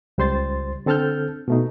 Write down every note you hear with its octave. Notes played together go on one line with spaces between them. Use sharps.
C#2 G3 C5 C6 A6
D3 C4 A4 A5 F6 G6
B2 A3 D#4